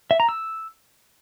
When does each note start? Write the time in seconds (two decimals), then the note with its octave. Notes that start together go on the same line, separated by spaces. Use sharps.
0.11 E5
0.20 A#5
0.29 E6